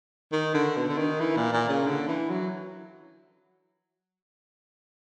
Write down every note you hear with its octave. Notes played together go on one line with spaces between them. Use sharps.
D#3
D3
B2
D3
D#3
E3
A#2
A#2
C#3
D3
E3
F#3